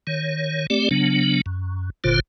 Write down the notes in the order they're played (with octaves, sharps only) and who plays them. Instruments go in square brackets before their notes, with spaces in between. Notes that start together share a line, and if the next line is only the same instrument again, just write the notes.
[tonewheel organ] D#3 C#5
A3 C4 G4 D5
C#3 F#3 B3 D4
F#2
F#1 A#2 D3 F4 C5